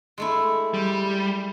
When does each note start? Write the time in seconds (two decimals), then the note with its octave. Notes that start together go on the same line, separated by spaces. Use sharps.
0.18 G#3 A3 E4
0.74 G3